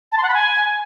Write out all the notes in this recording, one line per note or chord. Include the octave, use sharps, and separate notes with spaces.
A5
C6
F#5
B5
G#5